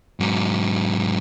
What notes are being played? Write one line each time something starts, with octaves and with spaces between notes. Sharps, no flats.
G#2 F#3